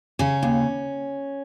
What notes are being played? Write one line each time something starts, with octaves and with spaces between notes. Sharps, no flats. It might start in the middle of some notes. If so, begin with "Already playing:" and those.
C#3 C#4
D#2